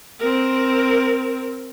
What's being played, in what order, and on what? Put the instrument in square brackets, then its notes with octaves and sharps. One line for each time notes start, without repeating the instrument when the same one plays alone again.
[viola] C4 A#4